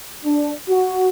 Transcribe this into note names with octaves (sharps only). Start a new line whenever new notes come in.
D4
F#4